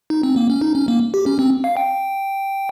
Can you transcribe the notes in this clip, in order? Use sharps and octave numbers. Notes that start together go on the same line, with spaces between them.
D#4
C4
A#3
C#4
D#4
C#4
A#3
G4
C#4
C4
F5
G5